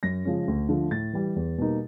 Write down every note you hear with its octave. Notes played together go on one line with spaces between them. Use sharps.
F#2 A#6
C#3 F3 G#3 C#4
D2
D3 F3 A3
A2 A6
E3 G3
E2
B2 G3 A#3 D#4